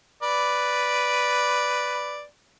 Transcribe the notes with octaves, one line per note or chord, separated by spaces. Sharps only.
B4 D5